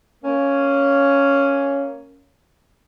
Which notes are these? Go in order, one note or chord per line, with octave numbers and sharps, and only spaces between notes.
A#3 C#4